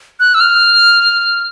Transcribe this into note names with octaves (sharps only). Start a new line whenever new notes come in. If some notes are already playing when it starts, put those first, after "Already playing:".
F#6
E6
F6